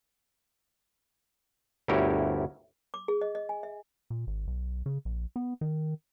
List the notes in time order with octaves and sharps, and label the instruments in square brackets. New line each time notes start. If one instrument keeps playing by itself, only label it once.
[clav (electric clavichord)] G1 D2 E4 G4 A#4 C#5
[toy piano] D6
G#4
D#5
D#5
G#5
E5
[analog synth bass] A#2
G#1
B1
C#3
A#1
B3
D#3